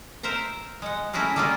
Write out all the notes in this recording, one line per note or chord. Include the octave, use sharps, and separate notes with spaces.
A#4 C5 E5 A#5
G#3 F#5
A3 C#4 E4 F#4 G#4 A#4
G3 A3 A#3 C#4 F4 G#4